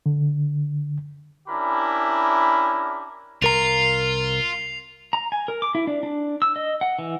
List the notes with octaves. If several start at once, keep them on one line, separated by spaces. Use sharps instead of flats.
D3
C#4 D4 E4 G4 A#4 B5
C2 F4 A#4 A#5 C7 F7
A#5
G#5
A#4
D6
E4
D4
D4
E6
D#5
F#5
E3